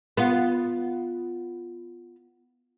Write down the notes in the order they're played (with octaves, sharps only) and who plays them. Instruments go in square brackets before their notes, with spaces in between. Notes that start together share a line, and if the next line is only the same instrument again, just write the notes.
[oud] B3 F4